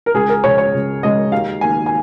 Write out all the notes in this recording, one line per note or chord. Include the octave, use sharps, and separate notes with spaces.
A#4
C#2 G#4
A#4
C#3 G#3 C#5
C#5
C#2
C#3 G#3 D#5
D#2 F5
D#3 A#3 G#5
G#5